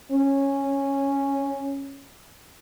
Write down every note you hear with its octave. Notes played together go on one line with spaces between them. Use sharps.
C#4